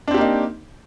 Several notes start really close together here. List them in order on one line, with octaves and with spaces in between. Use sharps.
D4 C4 G4 A#3 D#4